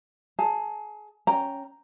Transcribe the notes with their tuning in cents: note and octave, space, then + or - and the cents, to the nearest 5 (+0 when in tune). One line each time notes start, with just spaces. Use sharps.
G#4 +25 A5 +30
C#4 +0 G5 +0 A#5 +0